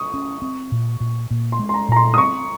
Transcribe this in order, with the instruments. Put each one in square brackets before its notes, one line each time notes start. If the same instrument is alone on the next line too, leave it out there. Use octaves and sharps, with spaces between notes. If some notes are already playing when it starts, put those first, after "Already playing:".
Already playing: [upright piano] C#6 D#6
[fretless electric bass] C#4
C4
A#2
A#2
A#2
[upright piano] C6
[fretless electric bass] G#3
[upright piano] C6
A#5
[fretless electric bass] A#2 [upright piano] A#5
[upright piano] C6
D#6
[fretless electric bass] C4 [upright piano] C#6